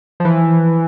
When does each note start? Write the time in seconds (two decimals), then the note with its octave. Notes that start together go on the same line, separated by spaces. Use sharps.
0.20 F3
0.25 E3